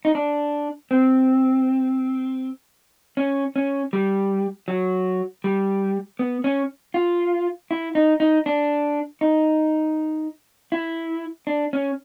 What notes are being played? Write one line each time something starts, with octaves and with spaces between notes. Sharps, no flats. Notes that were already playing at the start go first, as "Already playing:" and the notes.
D#4
D4
C4
C#4
C#4
G3
F#3
G3
B3
C#4
F4
E4
D#4
D#4
D4
D#4
E4
D4
C#4